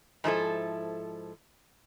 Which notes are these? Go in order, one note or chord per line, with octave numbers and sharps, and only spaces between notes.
G#2 F3 E4 A4